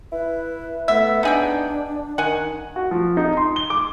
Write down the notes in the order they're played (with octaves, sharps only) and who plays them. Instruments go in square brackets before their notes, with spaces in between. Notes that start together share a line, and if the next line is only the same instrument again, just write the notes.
[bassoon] E4 [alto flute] B4
[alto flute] A3 [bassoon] B3 [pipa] E5
[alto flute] D4 [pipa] D#4 G#4 G5
[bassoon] D#3 [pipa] F#5 G#5
[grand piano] F#4
F3
D#4
C6
G7
D6